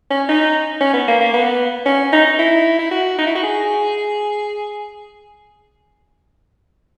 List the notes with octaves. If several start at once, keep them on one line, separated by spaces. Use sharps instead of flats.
C#4
D#4
C#4
B3
A#3
A#3
B3
C#4
D#4
E4
E4
F#4
D#4
E4
F#4
G#4